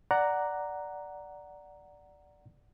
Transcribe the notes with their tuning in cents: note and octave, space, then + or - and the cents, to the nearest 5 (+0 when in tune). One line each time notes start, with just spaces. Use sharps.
D5 +0 F#5 +5 A#5 +0